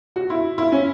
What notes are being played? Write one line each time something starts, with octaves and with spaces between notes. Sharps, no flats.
F#4
E4
E4
C#4